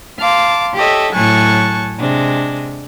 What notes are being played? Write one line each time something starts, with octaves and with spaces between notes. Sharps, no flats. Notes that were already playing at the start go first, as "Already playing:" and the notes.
F5 A5 C6 D6
G4 A4 C#5 D#5 E5
A2 F#3 G#5 A5 C#6 F#6
C3 G#3 D4